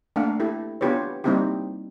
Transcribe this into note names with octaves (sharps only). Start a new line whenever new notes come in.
A3 A#3 D4 F5 F#5
E4 G4 A4
B3 D4 F4 G4 B4 C#5
G3 A#3 C4 D#4 E4 G4